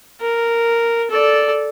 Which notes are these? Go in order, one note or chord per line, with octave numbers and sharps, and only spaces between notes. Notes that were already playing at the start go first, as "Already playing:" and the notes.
A#4
A4 D5